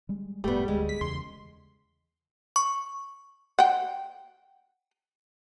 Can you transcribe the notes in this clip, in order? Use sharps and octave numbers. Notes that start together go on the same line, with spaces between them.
G3 G#3
F1 A2 G3 A3 B3
D2 G#3
B6
E2 C#3 C6
C#6
F#5 G5